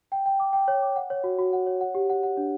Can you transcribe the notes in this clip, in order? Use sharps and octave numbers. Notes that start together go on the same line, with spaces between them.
G5
G5
D6
G5
C#5
D6
F#5
C#5
F#4
F#4
F#5
C#5
F#5
G4
F#5
F#5
D4